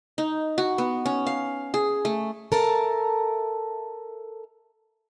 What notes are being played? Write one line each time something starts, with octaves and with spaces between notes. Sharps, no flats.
D#4
F#4
B3
C#4
F5
G#4
A3
A4 A#4 E5 A5